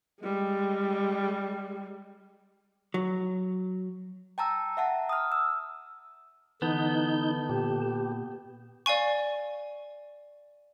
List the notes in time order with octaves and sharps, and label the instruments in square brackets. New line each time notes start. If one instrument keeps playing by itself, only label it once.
[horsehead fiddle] G3 G#3
[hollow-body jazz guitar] F#3
[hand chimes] G5 A5 A#5 E6
E5 F#5 A5 A#5
D#6 F6
E6
[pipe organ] D3 A5 [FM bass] E3 [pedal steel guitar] B3 [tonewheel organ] D#4 G6
[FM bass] A#2 [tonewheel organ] G4
[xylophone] D5 F5 G#5 C#6